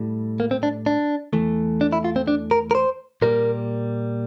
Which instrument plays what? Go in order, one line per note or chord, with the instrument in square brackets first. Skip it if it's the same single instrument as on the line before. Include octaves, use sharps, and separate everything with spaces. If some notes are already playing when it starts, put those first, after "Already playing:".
Already playing: [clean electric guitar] A2 G3
A#3
C4
D4
D4
E2 E3 A3
D4
E4
F4
C4
D4
A#4
A#4
C5
A#2 G3 A#3 A#4